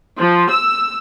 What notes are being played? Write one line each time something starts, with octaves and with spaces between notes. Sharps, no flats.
F3
E6